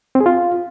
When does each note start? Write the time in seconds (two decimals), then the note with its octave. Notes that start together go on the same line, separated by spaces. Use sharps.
0.15 C4
0.21 G#4
0.26 F4